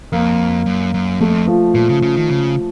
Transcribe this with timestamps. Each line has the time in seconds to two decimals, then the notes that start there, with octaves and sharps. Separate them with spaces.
0.12 F2 A#3
0.66 F#2
0.94 F#2
1.21 F2 A3
1.47 F3
1.74 A#2 F3
1.89 C#3
2.02 C#3
2.16 D#3
2.30 C#3